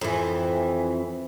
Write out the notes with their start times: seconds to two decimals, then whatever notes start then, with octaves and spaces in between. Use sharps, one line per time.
0.01 F2 E3